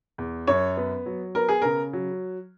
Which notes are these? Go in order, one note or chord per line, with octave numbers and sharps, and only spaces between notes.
E2
F#2 C#5
B3
F#3
B3 A#4
G#4
C#3 A#4
F#3